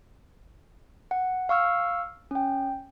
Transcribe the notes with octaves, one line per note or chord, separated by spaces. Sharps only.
F#5
F5 C#6 E6 F6
C#4 G5